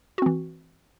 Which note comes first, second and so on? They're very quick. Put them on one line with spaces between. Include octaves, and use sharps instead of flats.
F#4 C4 E3